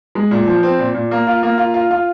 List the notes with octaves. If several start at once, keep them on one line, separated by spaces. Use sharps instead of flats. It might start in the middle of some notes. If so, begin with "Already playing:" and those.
G#3
A#2
F3
C4
A#2
A#2
A#3
F4
A#3
F4
F4
F4